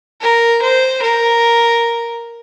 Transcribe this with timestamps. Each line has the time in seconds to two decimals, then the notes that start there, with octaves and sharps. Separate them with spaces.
0.22 A#4
0.62 C5
1.02 A#4